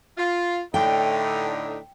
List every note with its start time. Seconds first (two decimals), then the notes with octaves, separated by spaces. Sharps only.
0.18 F4
0.74 A2 D3 D#4 G5